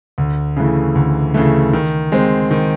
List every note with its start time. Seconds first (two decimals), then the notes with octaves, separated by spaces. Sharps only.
0.18 D2
0.57 C#3 E3 A3
0.95 D2
1.34 C#3 E3 A3
1.73 D#3
2.12 G#3 C4
2.51 D#3